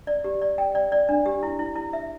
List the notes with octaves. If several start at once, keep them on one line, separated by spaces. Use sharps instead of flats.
D5
G4
D5
G5
D5
D5
D4
G4
E4
E4
E4
E5